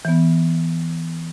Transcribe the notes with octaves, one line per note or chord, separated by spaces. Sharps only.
E3 B3